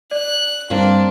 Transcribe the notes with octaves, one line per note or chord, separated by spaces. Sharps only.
D5 F#6
G2 A#3 C4 D4